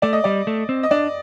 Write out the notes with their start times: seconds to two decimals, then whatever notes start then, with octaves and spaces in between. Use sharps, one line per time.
0.02 A3 D5
0.13 D#5
0.24 G3 D5
0.47 A3
0.69 C4
0.83 D#5
0.91 D4 D5